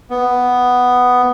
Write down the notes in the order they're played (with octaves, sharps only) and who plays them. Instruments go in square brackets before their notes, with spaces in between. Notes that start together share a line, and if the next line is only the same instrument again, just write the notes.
[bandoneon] B3